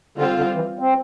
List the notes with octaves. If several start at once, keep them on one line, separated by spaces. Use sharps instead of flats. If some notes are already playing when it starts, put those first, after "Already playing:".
D3 G3 C4 F4
D3
E3
C4